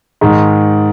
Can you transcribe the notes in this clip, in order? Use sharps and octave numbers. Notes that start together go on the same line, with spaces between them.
G#2 D#3 G#3